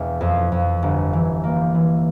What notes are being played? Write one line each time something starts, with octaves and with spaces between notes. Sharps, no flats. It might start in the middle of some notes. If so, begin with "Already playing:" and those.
Already playing: E1 E2
F2
F2
G1
E3
A#3
E3